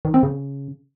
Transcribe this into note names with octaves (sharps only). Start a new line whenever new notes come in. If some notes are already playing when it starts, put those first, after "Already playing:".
D#3
C4
C#3